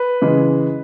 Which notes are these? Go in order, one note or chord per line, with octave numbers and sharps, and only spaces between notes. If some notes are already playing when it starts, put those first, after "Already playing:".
Already playing: B4
C#3 E3 G#3